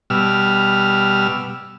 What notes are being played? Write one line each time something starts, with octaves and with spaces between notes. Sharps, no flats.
B2 G3 E6 F6